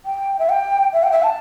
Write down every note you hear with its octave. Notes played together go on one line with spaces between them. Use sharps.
G5
E5
G5
E5
G5
E5
A5